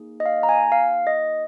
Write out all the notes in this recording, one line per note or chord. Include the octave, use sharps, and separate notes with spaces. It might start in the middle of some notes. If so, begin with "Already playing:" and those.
Already playing: A#3 D#4 G#4
D#5
F5
A#5
G#5
F5
D#5